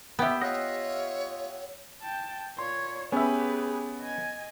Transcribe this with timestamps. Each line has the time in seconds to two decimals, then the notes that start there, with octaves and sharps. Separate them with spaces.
0.19 B3 G4 E5 G5
0.42 F4 C#5 D#5 F#5
2.02 G5 A5
2.59 A#2 C#5 C6
3.12 B3 C#4 G4 G#4 B4 E5
4.00 D#5 G#5